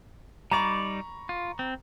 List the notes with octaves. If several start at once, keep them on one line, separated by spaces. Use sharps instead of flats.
G3 D#4 D5 A#5 B5 C#6
F4
C4